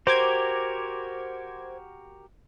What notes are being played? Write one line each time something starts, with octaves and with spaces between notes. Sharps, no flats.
F#4 G4 A#4 C5 D6 G#6